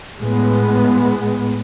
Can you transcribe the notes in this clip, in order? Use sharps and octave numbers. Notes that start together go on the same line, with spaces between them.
A2 G#3 B3